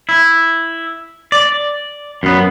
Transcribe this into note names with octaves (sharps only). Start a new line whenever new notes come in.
E4
D5
F#2 B3